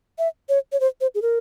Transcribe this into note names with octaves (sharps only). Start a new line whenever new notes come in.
E5
C#5
C#5
C5
C5
G#4
A#4